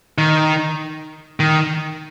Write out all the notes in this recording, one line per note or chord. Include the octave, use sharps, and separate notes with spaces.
D#3
D#3